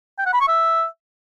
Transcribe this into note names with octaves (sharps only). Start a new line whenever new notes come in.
G5
F#5
B5
C#6
E5